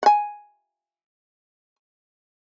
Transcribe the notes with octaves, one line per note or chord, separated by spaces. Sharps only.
F#5 G#5